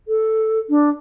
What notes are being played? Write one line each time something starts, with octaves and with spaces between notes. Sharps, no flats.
A4
D4